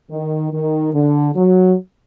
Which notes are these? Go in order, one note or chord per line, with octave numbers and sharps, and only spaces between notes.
D#3
D#3
D3
F#3